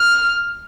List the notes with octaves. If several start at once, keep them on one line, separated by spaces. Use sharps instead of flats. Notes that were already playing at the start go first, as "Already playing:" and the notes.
Already playing: F6